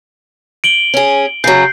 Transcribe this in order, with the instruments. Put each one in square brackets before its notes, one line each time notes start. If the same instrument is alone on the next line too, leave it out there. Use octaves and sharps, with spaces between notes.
[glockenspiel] D7 F#7 G7
[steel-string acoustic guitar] C#4 G#4
[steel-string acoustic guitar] C#3 F#3 [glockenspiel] G6 C7